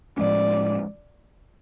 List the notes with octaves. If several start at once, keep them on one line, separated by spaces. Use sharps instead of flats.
A2 F3 G#3 C#4 D5